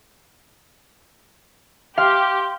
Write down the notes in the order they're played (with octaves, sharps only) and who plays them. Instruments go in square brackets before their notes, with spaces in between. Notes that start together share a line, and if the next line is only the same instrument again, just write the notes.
[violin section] G4 [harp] F5 [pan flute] C6